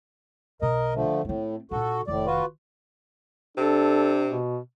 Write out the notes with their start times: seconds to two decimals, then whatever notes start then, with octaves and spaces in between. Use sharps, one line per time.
0.62 B1 B2 A#4 D#5
0.94 D3 F3 A3
1.25 A2 A3 C4
1.71 A#2 D#4 F#4 A4
2.07 F1 A2 D#3 D5
2.26 F4 F#4 B4
3.57 C3 D4 A4
4.25 B2